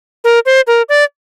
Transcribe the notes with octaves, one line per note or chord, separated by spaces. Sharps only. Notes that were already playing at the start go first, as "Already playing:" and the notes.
A#4
C5
A#4
D5